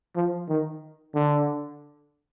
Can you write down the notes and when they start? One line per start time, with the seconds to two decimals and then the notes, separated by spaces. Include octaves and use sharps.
0.16 F3
0.48 D#3
1.14 D3